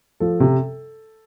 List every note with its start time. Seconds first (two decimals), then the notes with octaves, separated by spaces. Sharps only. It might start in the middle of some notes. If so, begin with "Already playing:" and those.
0.20 F3 A4
0.40 C3